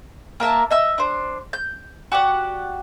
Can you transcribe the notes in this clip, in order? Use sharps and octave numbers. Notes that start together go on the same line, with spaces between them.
A#3 A#4 E5 A5
D#5 E5 E6
D4 C5
G6
F#4 G4 D5 F#5